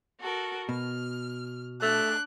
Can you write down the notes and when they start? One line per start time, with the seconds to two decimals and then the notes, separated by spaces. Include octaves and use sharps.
0.20 F#4 A4 A#4
0.69 B2 F6
1.82 A3 D4 F#6